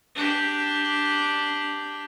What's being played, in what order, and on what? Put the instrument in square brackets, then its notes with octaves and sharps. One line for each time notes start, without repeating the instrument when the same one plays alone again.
[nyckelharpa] D4 G4